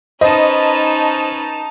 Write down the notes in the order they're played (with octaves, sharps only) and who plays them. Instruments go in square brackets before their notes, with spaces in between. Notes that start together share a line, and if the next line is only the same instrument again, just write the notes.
[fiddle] C#4 B4 [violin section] D#4 A5 [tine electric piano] C5 [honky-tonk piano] D#5